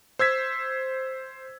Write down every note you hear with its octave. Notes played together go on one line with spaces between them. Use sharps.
C5 E6 G#6 B6